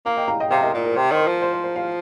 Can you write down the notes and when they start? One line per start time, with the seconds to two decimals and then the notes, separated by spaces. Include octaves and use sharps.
0.06 A#3 F5 A#5
0.17 D#5 G5
0.28 F5 A#5
0.40 D#5 G5
0.51 C3 C5 F5
0.63 A#4 D#5
0.74 A#2
0.85 A#4
0.96 C3 C5
1.12 D#3 C5
1.20 A#4
1.27 F3
1.42 C5
1.53 C5
1.64 C5
1.76 C5 F5